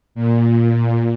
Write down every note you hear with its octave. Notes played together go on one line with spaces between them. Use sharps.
A#2